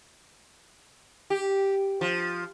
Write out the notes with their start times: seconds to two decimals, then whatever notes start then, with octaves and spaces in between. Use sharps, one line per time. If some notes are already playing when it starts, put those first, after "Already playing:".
1.30 G4
2.01 F3